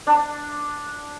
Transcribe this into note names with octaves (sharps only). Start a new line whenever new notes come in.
D4